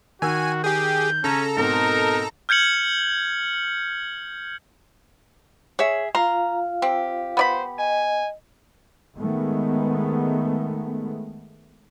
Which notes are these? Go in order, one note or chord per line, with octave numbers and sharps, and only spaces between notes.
D#3 F#4 G#5 E6
G4 G#4 G6
C#3 C#4 A4 A#5
G#2 B2 C4 D#4 A#4
F6 G6 G#6 C#7 F#7
G#4 C#5 E5
F4 F5 A#5 C6
C4 G4
B3 C5 D5 B5
D#5 G#5
D#3 G#3 A3 B3